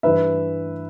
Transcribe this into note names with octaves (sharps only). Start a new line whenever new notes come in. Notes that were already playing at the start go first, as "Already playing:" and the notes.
G2 E3 B4 E5